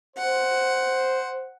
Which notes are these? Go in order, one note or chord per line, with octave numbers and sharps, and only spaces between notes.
C5 F#5